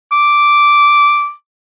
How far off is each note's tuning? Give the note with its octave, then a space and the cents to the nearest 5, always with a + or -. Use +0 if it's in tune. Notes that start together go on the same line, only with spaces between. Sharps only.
D6 -5